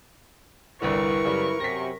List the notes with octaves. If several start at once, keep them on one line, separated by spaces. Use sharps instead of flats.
G1 C2 D3 E4 A#4 B4 C#6
F#2 C#3 G3
F#2 C3 A#6 B6